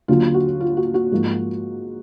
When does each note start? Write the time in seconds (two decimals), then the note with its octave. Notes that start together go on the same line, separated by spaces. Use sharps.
0.08 D#2 D3 F#3 F4
0.34 F#4
0.60 F4
0.77 F#4
0.94 F#4
1.12 G#2 F3 A#3